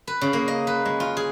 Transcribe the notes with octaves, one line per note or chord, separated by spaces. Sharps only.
B4
C#3
A#3
D#5
B4
G#3
F4
G#4